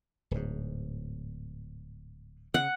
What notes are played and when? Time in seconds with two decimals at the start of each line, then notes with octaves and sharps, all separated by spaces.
0.31 D1 G#2
2.54 C#3 F#5